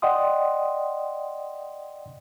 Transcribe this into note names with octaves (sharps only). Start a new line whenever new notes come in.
D5 D#5 F#5 G5 C6 D#6